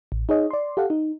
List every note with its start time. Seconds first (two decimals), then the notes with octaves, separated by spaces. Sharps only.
0.12 A1
0.29 D#4 G#4 C#5 D#5
0.51 D5 C6
0.77 G4 A4 F5 F#5
0.90 D#4